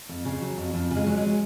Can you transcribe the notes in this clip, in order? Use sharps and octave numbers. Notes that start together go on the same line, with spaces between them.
F2
C#3
F#3
F2
F2
C#3
G#3
F#3
G#3